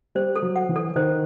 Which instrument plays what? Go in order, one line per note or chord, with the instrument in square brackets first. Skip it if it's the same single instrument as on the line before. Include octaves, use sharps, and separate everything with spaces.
[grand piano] G3 [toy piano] C5
[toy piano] A4
[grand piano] F#3
[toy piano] F#5
[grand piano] E3
[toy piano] A4
[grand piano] D#3 [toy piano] C5